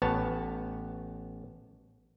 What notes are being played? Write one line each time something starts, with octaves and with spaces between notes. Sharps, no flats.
A1 B3 C#5 A5